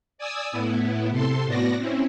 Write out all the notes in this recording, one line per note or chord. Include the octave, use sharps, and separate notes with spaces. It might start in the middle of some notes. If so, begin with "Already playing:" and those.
D5 G#5 D#6 E6
A2 B3 E4
C3 A4 C6
A2 B3 F#4 D5 A#6
C4 C#4 E4